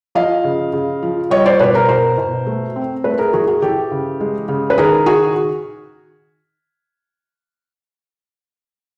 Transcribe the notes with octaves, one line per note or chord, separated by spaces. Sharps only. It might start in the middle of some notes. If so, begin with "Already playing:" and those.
F3 D#5 F5
C#3
C#3
F3
G3 C#5 D#5
C5 D5
B2 B4 C#5
A#4 C5
B2 A#4 C5
B2
A3
C4
A3 A4 B4
G#4 A#4
E3 F#4 G#4
F#4 G#4
E3 G4 A4
C#3
G#3
C#3
B4
D#3 G#4 A#4
F#4 G#4